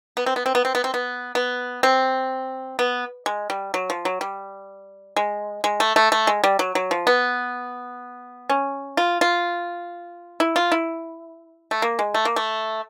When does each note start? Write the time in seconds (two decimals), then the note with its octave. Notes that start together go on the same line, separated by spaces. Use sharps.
0.17 B3
0.26 C4
0.36 B3
0.46 C4
0.55 B3
0.65 C4
0.75 B3
0.84 C4
0.94 B3
1.35 B3
1.83 C4
2.79 B3
3.26 G#3
3.50 G3
3.74 F#3
3.90 F3
4.05 F#3
4.21 G3
5.16 G#3
5.64 G#3
5.80 A3
5.96 A3
6.12 A3
6.27 G#3
6.44 G3
6.59 F#3
6.75 F#3
6.91 F3
7.07 B3
8.49 C#4
8.97 F4
9.21 F4
10.40 E4
10.56 F4
10.72 E4
11.71 A3
11.82 A#3
11.99 G#3
12.14 A3
12.25 A#3
12.36 A3